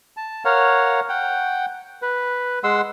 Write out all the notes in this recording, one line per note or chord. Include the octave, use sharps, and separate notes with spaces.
A5
A#4 C#5 F5 F#5
F#5 G5
B4
G#3 F#5 C6 E6